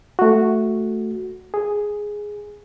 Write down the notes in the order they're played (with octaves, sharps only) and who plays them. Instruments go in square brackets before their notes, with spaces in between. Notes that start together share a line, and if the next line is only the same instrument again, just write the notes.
[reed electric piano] A3 F#4
G#4